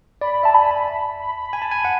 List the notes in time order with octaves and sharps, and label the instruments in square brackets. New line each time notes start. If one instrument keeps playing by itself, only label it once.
[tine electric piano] D5 [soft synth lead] B5
[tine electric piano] E5 [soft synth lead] A5
[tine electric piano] G#5 [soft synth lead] B5
[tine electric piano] A5
[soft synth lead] B5
B5
[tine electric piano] G#5
A5
G#5
F#5